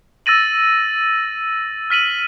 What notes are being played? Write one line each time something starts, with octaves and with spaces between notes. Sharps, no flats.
E6 A6 A#6 D#7 F#7
F6 B6 D#7 F#7